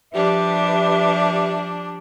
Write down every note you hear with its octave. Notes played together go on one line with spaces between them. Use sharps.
F3 G3 D4 G4 B4 E5